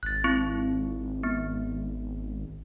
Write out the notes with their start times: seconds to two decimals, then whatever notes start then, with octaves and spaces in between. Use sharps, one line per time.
0.03 G#1 F#6 A6
0.24 C4 E4 C#6
1.23 B3